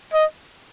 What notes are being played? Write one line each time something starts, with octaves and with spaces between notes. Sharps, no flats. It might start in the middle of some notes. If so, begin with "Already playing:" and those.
D#5